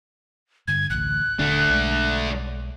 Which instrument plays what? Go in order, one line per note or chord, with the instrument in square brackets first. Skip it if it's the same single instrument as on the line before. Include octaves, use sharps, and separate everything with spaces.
[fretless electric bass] G2 D3 [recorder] G#6
[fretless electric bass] A1 D2 [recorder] F#6
[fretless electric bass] D#1 D3 [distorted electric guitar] A3 D4
[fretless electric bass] B1 G#3